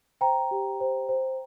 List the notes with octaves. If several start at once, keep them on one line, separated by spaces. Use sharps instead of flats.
C5 G5 A#5
G4
C5
C5